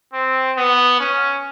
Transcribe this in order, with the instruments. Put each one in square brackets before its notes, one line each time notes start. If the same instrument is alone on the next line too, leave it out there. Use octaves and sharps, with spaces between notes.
[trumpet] C4
B3
C#4